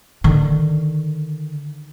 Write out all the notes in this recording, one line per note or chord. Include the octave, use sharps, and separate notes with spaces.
D3 D#3